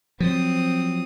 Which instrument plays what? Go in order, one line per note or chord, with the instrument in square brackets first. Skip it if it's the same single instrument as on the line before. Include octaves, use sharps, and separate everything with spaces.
[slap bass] F3 F#3 [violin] C4 D#6